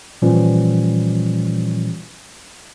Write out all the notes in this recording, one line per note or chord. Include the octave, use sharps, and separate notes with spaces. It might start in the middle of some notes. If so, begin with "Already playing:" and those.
A#2 E3 F3 G3 C#4